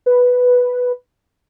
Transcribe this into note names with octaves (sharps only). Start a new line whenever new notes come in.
B4